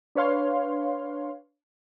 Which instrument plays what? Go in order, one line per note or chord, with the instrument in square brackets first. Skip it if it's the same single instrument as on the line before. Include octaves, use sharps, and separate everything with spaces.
[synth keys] D4 B4 C#5 F5 C6